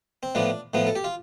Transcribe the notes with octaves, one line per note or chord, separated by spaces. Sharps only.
C4
A2 F3 B3 D4
A2 F3 B3
A4
G4
F4